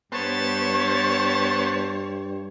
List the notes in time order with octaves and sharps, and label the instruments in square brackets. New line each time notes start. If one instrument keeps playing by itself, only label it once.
[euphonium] G2 [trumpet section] G3 G4 A5 [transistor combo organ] B3 C5 [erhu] C#5